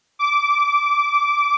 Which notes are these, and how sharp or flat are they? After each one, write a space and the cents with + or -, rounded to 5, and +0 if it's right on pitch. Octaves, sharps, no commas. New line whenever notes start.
D6 -15